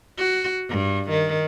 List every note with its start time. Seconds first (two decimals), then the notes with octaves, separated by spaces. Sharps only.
0.18 F#4
0.69 G2
1.10 D#3